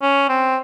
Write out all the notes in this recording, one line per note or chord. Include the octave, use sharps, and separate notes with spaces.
C#4
C4